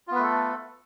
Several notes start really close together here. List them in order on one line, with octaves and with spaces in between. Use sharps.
F4 B3 B4 A3 A4